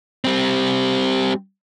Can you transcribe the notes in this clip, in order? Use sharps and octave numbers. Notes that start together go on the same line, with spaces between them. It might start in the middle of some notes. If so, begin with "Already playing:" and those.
G3 C4